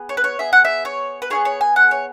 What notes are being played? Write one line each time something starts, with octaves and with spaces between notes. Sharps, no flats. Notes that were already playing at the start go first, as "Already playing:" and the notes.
Already playing: B3 G#4
C#5
B4
C#5
B3 G#4 E5
F#5
E5
C#5
B4
B3 E4 G#4 C#5
C#5
G#5
F#5
C#5